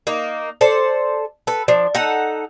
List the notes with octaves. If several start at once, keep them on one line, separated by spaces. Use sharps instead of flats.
A#3 D#4
A4 C5 D5 A5
A4 B4
F3 D4
D#4 A4 F#5